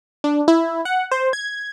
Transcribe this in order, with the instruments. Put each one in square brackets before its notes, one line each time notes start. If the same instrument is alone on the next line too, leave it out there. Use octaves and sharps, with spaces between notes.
[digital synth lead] D4
E4
F#5
C5
G#6